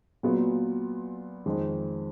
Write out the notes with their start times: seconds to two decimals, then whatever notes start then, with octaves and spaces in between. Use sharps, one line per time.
0.23 A#2 F#3 B3 F4
1.46 F2 D#3 G#3